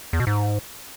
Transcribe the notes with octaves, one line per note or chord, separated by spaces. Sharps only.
E2
B2
G#2